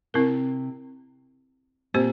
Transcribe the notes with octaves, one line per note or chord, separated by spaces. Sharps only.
C3 C4 E4 A#4
A#2 C4 G4 C5